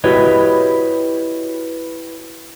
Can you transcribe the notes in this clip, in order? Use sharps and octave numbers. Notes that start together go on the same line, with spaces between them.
E4 F#4 G4 B4 C#5 D#5